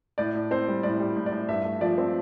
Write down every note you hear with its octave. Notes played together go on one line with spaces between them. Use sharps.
A2 D5
A2
C4 C5
G3
A2 D5
G3
A2
D5
A2
G2 E5
A3
F3 D5
C4